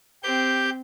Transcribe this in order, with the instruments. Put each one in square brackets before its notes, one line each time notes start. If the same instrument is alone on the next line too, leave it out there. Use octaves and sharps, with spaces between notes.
[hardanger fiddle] C4 [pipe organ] G4 G6